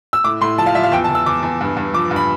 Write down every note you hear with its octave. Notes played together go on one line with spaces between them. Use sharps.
E6
A2 D6
A2 C6
F3 A5
F5
F3 E5
F5
E2 G5
A5
E2
E6
E2 D6
E2
G2
G2
F3 D6
G2
B5